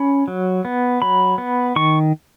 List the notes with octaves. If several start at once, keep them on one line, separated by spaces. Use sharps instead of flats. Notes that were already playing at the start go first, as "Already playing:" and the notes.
Already playing: C#4 B5
F#3
B3
F#3 B5
B3
D#3 C#6